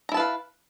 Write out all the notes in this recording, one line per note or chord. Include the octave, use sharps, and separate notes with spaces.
E4 B4 F5 A5 A#5